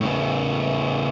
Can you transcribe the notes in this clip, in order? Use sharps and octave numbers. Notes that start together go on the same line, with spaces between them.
A2 C#3